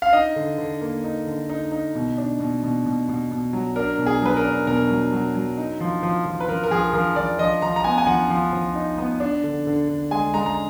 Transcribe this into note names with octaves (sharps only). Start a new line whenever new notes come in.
F5
D#4 D#5
D3
D3
A#3
D#4
D3
D#4
D#4
B2
D4
B2
B2
B2
B2
B2
F#3
D4 A#4
B2
G#4
F#3 B4
A#4
D4
B2 A#4
F#3
F#3
F#3
D#4
F3
F3
F3
B4
F3 A#4
A#4
F3 G#4
F3 A#4
F3 D5
F3 D#5
F3 A#5
A#5
B3 G#5
G#5
F3 F#5
F3
F3
D#4
B3
D4
D3
D3
D3
G#3 G#5
G#3 A#5
A#5